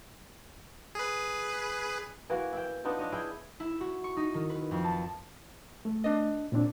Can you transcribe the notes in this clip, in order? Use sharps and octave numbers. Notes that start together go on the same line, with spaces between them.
G#4 B4
E3 A#3 F#4 A#4
E4 E5 G5
B3 D4 D#4 F4
D4 C#5 D#5
E4 G#4 G5
E4
F#4
C#6
D#4
D#3
B4
F2
A5
A3
D4 D#5
A#2 C4 D4